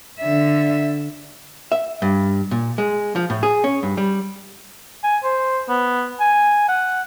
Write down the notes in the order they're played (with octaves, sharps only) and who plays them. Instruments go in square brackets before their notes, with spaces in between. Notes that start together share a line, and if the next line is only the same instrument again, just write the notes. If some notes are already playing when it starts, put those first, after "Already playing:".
[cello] D3 E5
[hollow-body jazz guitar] E5
G2
A#2
G#3
F3
A2
G#4
C#4
G2
G3
[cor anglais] G#5
C5
B3
G#5
F#5